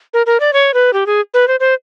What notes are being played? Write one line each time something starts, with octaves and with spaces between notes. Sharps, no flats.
A#4
A#4
D5
C#5
B4
G4
G#4
B4
C5
C5